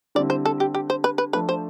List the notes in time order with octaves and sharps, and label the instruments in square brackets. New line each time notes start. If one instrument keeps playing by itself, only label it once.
[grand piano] D3 G3 C4 E4 [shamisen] D5
[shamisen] C5
A4
G4
G4
C5
B4
B4
[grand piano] F3 A3 D4 [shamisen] B4
[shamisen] C5